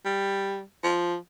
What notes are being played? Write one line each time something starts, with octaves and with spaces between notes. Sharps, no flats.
G3
F3